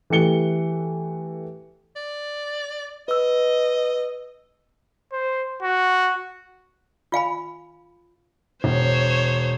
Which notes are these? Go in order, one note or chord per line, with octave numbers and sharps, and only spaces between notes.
E3 A3 G4 C#7 G7
D5
B4 D#5 E6
C5
F#4
F4 F5 G#5 B5
E1 C5 C#5